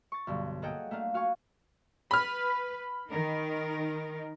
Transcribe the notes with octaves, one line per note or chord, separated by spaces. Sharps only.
C#6 A6
B1 G2 D3
A#3 G#4 A4 D#5 F#5 G5
A3 A#3 D4 F5
F#4 F5 G#5 C#6
B4 B5 F6
D#3 D#4 A#4